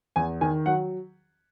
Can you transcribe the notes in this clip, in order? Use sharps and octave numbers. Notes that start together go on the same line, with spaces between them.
E2 G#5
D#3 G#5
F#3 F#5